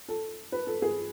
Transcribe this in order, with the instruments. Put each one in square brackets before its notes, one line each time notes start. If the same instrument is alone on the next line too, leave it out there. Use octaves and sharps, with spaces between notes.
[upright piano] A4
B4
A4
G#4